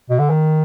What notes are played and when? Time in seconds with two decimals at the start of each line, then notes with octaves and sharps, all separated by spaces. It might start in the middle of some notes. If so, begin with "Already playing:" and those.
0.10 B2
0.19 D3
0.30 D#3